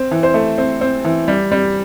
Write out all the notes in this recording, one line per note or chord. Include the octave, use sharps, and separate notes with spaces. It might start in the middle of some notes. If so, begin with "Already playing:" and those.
Already playing: C4
E3
C5
A3
C4
C4
E3
G3
G3